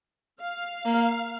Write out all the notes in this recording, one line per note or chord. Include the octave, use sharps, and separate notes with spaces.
F5
A#3